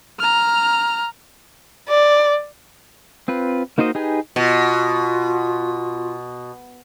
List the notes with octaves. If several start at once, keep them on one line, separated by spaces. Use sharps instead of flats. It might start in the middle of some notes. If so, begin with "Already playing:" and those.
A#5 F6
D5
C4 F4 B4
A#3 D#4 F#4 C5 D#5
D#4 G4 G#4 B4 G#5
B2 F4